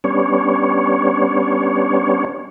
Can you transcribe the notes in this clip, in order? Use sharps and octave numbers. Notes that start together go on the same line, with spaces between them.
G3 B3 C#4 D4 C#5